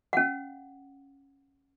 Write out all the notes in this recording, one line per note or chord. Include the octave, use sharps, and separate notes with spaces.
C#4 F5 F#5